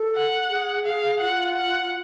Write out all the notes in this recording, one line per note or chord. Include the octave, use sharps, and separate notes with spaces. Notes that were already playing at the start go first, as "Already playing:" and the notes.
Already playing: A4
F#5
G#4
G#4 F5
F4 F#5
F#5